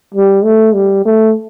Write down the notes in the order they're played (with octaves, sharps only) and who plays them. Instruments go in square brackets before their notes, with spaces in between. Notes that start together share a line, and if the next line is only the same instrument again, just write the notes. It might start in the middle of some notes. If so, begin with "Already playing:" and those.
[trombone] G3
A3
G3
A3